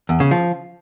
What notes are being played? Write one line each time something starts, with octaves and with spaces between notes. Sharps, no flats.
E2
C#3
F3